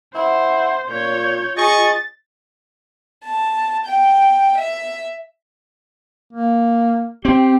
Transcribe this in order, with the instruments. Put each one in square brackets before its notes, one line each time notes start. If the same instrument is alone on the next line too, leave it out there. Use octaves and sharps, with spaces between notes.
[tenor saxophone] E4 [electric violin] C5 [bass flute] F#5
[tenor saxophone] A#2 [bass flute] F4 [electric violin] C#5 G6
[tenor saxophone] G#4 [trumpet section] D#5 C#6 [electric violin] A6
[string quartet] A5
G5
E5
[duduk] A#3
[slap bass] C4 [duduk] G4